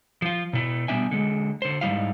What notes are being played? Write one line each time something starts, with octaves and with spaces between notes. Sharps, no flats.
F3 F4
B2 E4
B2 G3 B3 D4 E5 G#5
D3 G#3
D3 C5
G#2 D#3 F3 G3 E4 F5